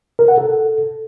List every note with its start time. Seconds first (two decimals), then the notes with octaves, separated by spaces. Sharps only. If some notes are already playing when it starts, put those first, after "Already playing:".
0.19 A#4
0.28 F#5
0.38 A4